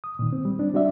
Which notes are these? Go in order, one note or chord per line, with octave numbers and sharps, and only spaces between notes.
D#6
A#2 D#3
C4
G3
C4 D4
G3 D4 F#4 D5 E5